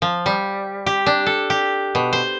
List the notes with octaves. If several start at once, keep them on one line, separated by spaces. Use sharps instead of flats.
F3
G3
G4
D4
A4
G4
B2
C5